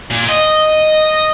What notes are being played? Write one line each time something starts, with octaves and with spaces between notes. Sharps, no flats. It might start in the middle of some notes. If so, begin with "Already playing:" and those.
A#2
D#5